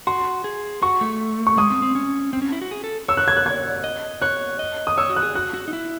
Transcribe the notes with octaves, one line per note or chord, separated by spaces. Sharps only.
F#4 C6
G#4
F#4 C#6
A3
C#6
G#3 D#6
C4
C4
C#4
C4
C#4
E4
F#4
G#4
A4
C#5 E6
F#6
G#6
F#6
G#6
D#5
C#5 F#6
D#5
D#6
C#5 E6
F#4
F#6
G#4
F#4 F#6
F#4
D#4
E4